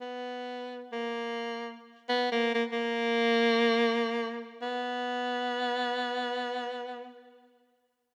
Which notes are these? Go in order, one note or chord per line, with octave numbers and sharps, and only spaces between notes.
B3
A#3
B3
A#3
A#3
A#3
B3